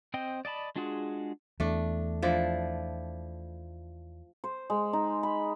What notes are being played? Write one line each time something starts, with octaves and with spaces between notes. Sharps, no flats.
C4 C5 D#5 G5
D5 D#5 A5 B5
G#3 D4 F4 F#4 G#4
E2 A3 D4
F3 D4 E4
C5
G#3
D#4
B5